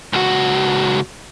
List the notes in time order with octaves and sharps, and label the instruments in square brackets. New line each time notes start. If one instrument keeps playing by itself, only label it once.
[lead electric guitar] C#2 F#4